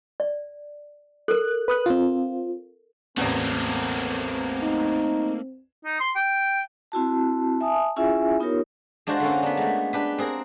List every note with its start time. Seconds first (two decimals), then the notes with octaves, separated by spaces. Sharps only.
0.20 D5
1.28 A4 A#4 F#6
1.68 B4 D#6 F#6
1.86 C4 F4
3.17 A1 E2 A3 A#3 C4
4.63 D#4
5.85 D#4
6.00 C6
6.16 G5
6.92 C4 E4 F#4 A5
7.61 E5 G#5 A5 D#6
7.96 C#4 E4 F4 G#4 E5 G#5
8.40 B3 D#4 F4 G4 A#4 C#5
9.07 G#3 D4 F4 F#4 C5 D5
9.20 D3 A#3 C#4
9.43 B3 D4
9.57 G#3 A3
9.93 D4 G4 B4
10.18 C4 G#4 A#4